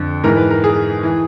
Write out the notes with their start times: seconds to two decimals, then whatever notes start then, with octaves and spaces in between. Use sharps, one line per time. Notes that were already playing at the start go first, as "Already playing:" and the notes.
Already playing: F2 D3
0.24 G#2 E3 A#4
0.37 B4
0.50 A#4
0.64 G#4
1.03 E3